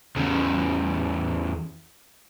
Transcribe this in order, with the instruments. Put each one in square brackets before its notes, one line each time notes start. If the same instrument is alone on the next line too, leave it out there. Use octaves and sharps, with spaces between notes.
[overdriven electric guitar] E2 C#3